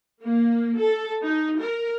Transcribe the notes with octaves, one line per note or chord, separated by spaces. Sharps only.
A#3
A4
D#4
A#4